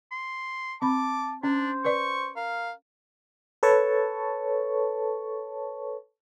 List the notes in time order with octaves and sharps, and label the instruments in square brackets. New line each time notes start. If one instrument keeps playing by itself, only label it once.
[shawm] C6
[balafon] C4 B5 [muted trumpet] A5 [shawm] D6
[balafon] C#4 [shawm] D4 [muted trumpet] C5
[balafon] B4 D5 [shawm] C#6
[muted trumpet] A#4 [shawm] F5
[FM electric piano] A4 B4 C#5 A5 C#6